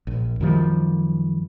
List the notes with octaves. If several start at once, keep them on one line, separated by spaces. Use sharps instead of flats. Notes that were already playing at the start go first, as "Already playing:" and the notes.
A#1
F#2 D#3 F3 G3